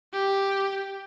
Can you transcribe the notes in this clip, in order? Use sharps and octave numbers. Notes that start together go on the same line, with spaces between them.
G4